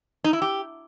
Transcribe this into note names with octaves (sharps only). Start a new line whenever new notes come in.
D#4
E4
G4